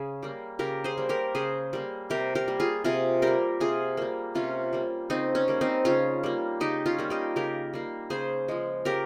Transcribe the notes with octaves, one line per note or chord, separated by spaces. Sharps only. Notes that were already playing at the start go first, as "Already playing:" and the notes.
Already playing: C#3 G#4
G3 A#3
C#3 G4 A#4
G#4 C5
G3 A#3
G4 A#4
C#3 G#4 C5
G3 A#3
C3 G4 A#4
G4 A#4
G3 A#3
F4 G#4
C3 F4 G#4
G3 A#3 G4 A#4
C3 F4 G#4
G3 A#3
C3 C#4 F4
G3 A#3
C#3 C4 D#4
C#4
G3 A#3
C4 D#4
C#3 C#4 F4
G3 A#3
C#3 D#4 G4
C#4 F4
G3 A#3
D#4 G4
C#3 G4 A#4
G3 A#3
C#3 G#4 C5
F3 G#3
C#3 G4 A#4